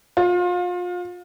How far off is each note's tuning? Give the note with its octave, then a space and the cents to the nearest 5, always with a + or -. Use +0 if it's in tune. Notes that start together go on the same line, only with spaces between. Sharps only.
F4 +30